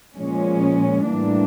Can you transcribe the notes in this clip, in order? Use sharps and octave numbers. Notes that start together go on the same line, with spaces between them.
A#2 F3 G#3 C#4
A2 E3 G3 A#3 D4